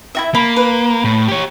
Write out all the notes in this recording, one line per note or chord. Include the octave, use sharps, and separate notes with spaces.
E4 F#4 E5
A#3 B5
B4
A2
G4 C#5